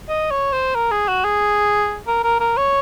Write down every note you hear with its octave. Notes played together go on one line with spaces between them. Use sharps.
D#5
C#5
C5
A#4
G#4
F#4
G#4
A#4
A#4
A#4
C#5